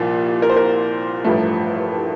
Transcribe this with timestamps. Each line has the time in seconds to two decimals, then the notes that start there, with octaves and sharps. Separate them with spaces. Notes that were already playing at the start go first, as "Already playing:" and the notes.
Already playing: C2 A#2 F3 A#3
0.42 A#4
0.49 C5
0.57 A#4
1.24 A1 G2 F3 A3